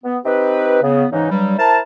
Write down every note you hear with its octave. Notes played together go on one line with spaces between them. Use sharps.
B3
C4 D#4 G4 B4
C#3 B3
G#2 C#3 E3 D#4
G2 F#3 G3
E4 A#4 C5 A5